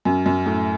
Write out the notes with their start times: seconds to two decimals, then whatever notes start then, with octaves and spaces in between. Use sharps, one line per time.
0.05 F#2
0.26 F#2
0.46 A2